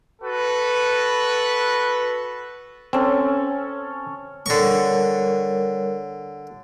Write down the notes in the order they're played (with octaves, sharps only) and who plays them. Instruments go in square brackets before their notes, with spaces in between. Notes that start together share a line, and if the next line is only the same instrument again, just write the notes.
[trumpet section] F#4 A4 B4
[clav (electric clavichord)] C4 [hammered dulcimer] C#4 A4
[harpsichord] D3 C#6 [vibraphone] G3 A#4 C#5